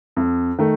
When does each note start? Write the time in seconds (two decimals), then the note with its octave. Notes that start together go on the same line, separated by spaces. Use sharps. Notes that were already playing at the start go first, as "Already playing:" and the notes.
0.17 F2
0.58 D#3 A3